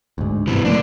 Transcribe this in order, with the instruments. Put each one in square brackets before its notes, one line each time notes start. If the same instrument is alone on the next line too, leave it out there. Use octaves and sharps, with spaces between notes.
[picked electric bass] D2 G#2
[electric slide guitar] G2 E3 [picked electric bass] C3 B3
[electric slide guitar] D3 D4 [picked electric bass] F3 A3 A#3